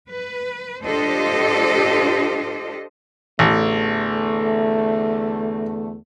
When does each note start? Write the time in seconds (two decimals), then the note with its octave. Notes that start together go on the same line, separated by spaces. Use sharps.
0.10 B4
0.86 D4 F4 G4 A4 C5 D#5
3.39 A1 E2 D3 A3